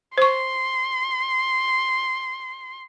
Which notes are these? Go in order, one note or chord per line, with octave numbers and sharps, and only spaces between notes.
C5 C6 C#6